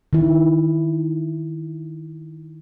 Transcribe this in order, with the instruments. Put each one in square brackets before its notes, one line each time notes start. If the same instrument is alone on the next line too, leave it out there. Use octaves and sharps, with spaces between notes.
[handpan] D#3 E4